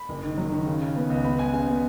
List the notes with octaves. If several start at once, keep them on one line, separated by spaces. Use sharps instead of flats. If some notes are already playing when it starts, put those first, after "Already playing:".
Already playing: B5
F#1
D#3
F#3
D#3
C#3
C#3
B3
C#2
B3 B5
C#2 G#5
C#3 G#5
B3